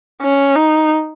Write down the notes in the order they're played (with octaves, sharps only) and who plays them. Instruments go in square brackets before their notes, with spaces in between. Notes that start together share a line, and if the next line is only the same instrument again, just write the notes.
[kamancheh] C#4
D#4